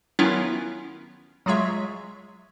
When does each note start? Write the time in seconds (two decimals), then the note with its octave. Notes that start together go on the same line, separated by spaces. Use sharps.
0.19 D#3 F#3 B3 C#4 E4 F4
1.46 F#3 G#3 F4 G#4 C#5 E5